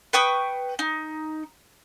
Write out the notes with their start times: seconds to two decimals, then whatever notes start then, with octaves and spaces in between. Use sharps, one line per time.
0.13 B4 G5 C#6 D#6
0.79 D#4